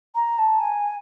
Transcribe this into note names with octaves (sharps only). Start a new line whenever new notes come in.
A#5
A5
G#5